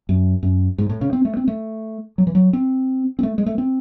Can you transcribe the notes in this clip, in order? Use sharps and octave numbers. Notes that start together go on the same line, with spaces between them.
F#2
F#2
G#2
A2
C#3
C4
A3
C4
A3
F#3
E3
F#3
C4
C4
A3
G#3
A3
C4